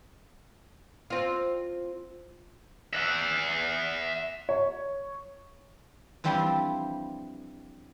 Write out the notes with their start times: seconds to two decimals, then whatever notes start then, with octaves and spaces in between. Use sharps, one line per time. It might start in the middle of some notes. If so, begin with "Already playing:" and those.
1.10 C4 F4
2.93 E5 F#5
4.49 C#5
6.24 E3 F3 G3 C4 D4 E4